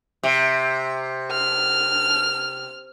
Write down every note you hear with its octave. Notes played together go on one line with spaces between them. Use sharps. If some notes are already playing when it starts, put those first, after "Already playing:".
C3
F6